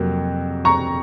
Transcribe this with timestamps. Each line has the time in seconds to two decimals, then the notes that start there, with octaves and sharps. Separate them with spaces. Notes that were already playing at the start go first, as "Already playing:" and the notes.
Already playing: F2 C3 F#3 A#3
0.65 A#5 C#6